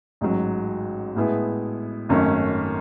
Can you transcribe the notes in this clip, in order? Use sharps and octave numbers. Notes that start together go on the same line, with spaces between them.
A1 G#2 F#3
A2 G#3 B3 E4 G#4
G#1 F#2 D#3 A3 C#4